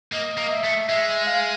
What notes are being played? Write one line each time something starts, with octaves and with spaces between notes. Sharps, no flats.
A#3 D#5
A#3
E5
A3
G#3 E5
F5